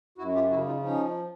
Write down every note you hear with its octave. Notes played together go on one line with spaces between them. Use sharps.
F#2 E4 F#4
F4 G4
C#3 E4 F#4
D#4 F4
F3 C#4 D#4